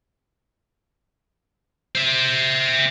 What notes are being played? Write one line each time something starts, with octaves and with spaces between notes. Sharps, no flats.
C5 E5